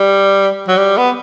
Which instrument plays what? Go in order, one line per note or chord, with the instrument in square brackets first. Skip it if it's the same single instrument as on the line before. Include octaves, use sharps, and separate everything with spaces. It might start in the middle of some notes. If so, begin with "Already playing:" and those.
Already playing: [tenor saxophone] G3
F#3
G3
B3